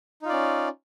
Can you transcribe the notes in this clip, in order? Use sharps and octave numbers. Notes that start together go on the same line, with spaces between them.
C#4 D#4 F4 D5